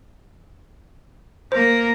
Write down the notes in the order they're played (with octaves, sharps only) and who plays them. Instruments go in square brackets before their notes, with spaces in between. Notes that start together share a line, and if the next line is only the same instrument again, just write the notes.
[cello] A#3 A#4 [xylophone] C5